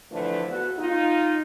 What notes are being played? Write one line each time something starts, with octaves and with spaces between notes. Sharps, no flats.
D3 E3 F3 A3
B3 F#4 A4
D#4 F4